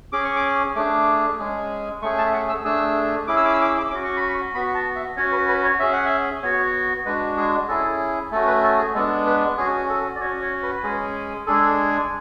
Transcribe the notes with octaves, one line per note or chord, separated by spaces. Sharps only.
C#4 G#4 D6
C#6
D6
A3 D4 G#4 D6
G#3 C#4 G#4
A3 C#4 G#4 C#6
A5
E5
F#5
E6
A3 D4 G#4 E6
C#4 E4 G#4 D6
E6
D6
E6
D6
E6
D6
C#4 F#4 D6
C#6
B5
C#6
B3 F#4 B5
A5
E5
C#4 F#4 C#5
B4
B4
C#5
C#4 G#4 E5
F#5
E5
B3 F#4 C#5
G#3 D4 F#4 B4
G#4
C#4 E4 G#4 A4
A3 C#4 F#4 A4
B4
A4
G#4
G#3 B3 D4 A4
B4
C#4 F#4 G#4
A4
D5
C#4 F#4 C#5
C#5
B4
G#3 C#4 G#4
G#3 D4 G#4 A4